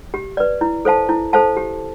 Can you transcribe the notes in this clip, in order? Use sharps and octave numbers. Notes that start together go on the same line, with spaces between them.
G4
B4 D5
E4
A4 C5 F5 A5
E4
A4 C5 F5 A5
G4